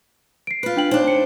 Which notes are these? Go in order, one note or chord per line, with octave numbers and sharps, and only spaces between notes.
C7 D7
F4 B4
D4 G5 F#7
D4 D#4 C5 C#5
C#7